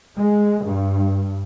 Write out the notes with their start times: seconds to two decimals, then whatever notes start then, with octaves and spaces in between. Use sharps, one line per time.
0.17 G#3
0.64 G2